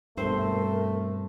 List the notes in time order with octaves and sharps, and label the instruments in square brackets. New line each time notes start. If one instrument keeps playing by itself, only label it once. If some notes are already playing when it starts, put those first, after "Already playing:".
[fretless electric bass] G2 B2 [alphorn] A3 [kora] C4 C5 [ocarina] A#4